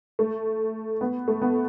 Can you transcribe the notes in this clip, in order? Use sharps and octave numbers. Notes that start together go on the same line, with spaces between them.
A3
B3
A3
B3